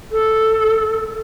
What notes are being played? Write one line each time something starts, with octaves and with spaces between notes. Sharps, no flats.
A4